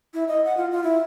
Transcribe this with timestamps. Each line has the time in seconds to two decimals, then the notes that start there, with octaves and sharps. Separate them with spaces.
0.14 E4
0.28 D#5
0.45 F#5
0.57 F4
0.72 F4
0.84 E4